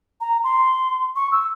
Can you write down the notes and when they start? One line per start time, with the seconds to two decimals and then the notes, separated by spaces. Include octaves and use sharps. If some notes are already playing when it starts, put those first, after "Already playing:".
0.21 A#5
0.44 C6
1.16 C#6
1.32 E6